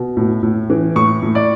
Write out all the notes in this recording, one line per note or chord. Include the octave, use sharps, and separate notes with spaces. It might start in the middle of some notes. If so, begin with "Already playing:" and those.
Already playing: B2
A2
A2
E3
A2 C#6
A2
D5